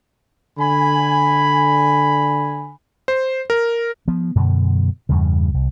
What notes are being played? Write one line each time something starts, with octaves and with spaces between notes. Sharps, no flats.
D3 G#5 B5
C5
A#4
F3 B3
F#2 B2 D3
E2 G2 C#3
C2